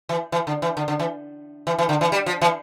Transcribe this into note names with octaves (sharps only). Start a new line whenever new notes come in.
E3
E3
D3
E3
D3
D3
E3
E3
E3
D3
E3
G3
F3
E3